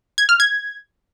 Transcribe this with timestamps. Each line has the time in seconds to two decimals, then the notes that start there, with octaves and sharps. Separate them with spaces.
0.18 G#6
0.29 F6
0.40 G#6